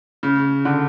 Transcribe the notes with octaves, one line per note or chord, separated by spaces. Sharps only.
C#3
D3